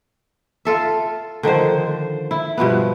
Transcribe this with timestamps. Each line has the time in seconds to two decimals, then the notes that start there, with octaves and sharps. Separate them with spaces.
0.65 F4 A4 E5
1.43 D3 D#3 F3 C5
2.31 E4
2.57 G2 B2 F3 B3